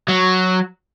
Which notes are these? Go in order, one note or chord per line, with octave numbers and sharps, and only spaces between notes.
F#3